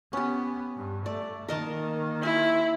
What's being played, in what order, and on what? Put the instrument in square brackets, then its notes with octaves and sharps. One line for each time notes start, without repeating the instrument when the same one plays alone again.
[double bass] B3 [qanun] C#4 G4
[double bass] G2
[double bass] A3 [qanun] D5
[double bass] D#3 A#3 [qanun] A#4 D#5 A5
[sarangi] E4 [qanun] G#5 C6